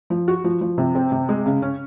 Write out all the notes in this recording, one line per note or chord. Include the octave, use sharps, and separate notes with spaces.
F3
F#4
F3
F3
C3
C4
C3
G#3
C#3
C#4